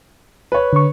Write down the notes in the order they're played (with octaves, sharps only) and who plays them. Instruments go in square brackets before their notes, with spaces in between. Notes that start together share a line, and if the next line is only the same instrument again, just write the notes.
[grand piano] B4 C#5
[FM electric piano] D3 C#6